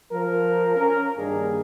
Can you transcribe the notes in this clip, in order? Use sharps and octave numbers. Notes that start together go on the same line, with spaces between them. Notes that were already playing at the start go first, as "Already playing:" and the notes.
F3 A#4
C#4 A#4
G2 D#3 G3 A#3 D4 G#4